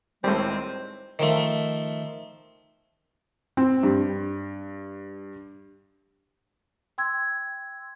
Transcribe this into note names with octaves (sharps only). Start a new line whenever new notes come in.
C#2 A2 D#3 G3 G#3 C4
D#3 F3 A3
C4
G2
G5 C6 E6 G#6